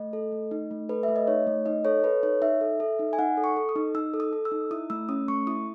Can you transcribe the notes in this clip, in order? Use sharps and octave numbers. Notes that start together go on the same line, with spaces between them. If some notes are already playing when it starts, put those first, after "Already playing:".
Already playing: A3 D#5
A4
A3
D#4
A3
A4 B4
E5
A3
D#5
D#4 C#5
A3
D#4 D#5
A4 C#5
A4 B4
D#4 C#5
D#4 E5
A4
A4
D#4
G#5
D#4 F#5
A4
C#6
A4
D#6
D#4
D#4 E6
A4
D#6
A4
E6
D#4
E4 D#6
A3 E6
C#4 D#6
A3 C#6
E4 D#6